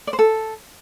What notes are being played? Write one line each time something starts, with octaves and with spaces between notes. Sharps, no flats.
D5
C5
A4